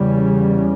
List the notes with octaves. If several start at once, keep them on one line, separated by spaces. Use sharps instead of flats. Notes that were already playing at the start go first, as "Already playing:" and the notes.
Already playing: E2 C#3 G3